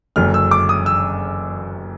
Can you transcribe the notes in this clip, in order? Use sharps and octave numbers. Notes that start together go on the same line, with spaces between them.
F#1 F#2 D3 F#3 F6
E6
D6
D#6
E6